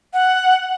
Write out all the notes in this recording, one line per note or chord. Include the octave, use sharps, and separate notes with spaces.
F#5